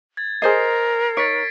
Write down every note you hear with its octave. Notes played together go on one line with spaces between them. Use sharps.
G#6 A6
G#4 A#4 C5 D#5 C7
D#4 C#5 A6 B6 D7